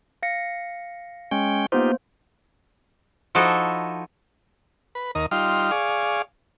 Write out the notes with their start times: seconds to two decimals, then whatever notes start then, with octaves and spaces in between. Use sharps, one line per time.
0.23 F5 A#6 C#7
1.31 G#3 C#4 G5
1.72 A#3 B3 D#4 F4 G4 C5
3.35 F3 D#4 E4 F#4 A4 D#5
4.95 B4
5.15 D#2 A#4 D#5
5.31 G3 D#4 F4 C6 F6
5.71 G#4 D5 F5 C#6